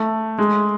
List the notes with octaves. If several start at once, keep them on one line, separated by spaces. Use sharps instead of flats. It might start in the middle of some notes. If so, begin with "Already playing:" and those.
Already playing: A3
G#3